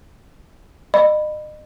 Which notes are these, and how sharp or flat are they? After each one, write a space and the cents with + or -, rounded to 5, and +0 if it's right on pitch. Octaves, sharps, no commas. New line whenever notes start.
D#5 -35 B5 +0